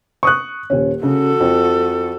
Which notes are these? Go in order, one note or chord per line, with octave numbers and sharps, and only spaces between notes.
C#6 D#6 F#6
D#1 C#4
C#3 F#4 A4
F2